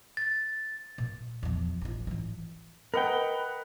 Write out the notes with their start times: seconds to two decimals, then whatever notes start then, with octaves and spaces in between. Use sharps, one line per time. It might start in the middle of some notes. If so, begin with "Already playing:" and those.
0.17 A6
0.98 A#2
1.43 E2 F3
1.81 A1 F4
2.07 A1 E3
2.94 A#4 B4 D#5 F#5 G5